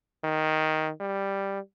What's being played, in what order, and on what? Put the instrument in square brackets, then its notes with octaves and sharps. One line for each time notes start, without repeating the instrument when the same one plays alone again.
[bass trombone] D#3
G3